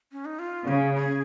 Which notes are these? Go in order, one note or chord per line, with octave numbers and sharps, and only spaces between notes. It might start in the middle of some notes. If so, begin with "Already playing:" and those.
C#4
D#4
F4
C#3 G#4
G#4